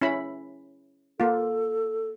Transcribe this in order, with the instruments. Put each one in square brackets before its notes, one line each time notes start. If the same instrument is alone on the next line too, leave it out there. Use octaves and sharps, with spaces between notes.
[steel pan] C#4 E4 B5
[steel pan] A#3 F4 [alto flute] A4